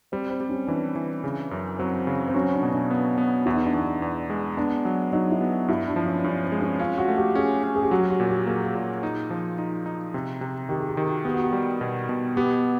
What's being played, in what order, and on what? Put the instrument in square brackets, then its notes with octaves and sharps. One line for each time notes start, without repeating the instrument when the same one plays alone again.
[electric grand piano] G3 [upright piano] C4
[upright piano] C4
[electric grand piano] G3
[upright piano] C#4
[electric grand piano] E3 [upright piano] D4
[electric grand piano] E3
C#3
F#2
[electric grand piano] F#3 [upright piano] C4
[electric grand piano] C#3
[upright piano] C4
[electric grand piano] F#3 [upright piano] C#4
[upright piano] D4
[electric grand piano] B2
[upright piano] D4
[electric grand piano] B3
B3
[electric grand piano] E2 [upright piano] E4
[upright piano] D#4
D4
[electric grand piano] E2 [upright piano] D#4
[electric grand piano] E2
G#3
[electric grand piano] B3 [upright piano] D4
[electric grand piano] F#3
[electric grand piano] F#3 [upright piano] D#4
[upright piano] E4
[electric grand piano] B3
[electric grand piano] G2 [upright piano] E4
[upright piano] D4
[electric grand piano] F3
[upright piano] C#4
[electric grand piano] G2 [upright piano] C#4
[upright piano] C4
[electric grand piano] G#3
[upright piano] C#4
[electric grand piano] C#4 [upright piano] F4
[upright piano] F#4
[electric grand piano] A3
[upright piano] G4
[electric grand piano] C#4 [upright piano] G#4
[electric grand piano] C#4
[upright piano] G#4
G4
[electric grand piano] F#3 [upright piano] F#4
[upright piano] G4
F#4
[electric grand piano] A#2
[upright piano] G4
[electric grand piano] A#3 [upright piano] G#4
[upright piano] G#4
[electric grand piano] A#2
D#4
F3
D#4
D#4
C3
C3
[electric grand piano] D#3 [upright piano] G4
[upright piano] G#4
G4
[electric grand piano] D#3
[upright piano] F#4
[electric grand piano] B3 [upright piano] G4
[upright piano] F#4
G4
[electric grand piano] G3
B2
B2
[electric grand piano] B3 [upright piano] G4